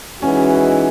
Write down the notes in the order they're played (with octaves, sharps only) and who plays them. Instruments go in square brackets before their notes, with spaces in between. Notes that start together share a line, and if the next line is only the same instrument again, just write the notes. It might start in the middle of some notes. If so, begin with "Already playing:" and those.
[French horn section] E3 G#3 D#4 F#4 [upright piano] C#4